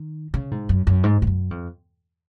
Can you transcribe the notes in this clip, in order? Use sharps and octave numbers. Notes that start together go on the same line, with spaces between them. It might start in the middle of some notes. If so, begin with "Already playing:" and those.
Already playing: D#3
C#3
G#2
F#2
F#2
G#2
G#2
F#2
F2